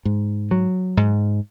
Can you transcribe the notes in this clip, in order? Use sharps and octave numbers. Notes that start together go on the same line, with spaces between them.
G#2
F#3
G#2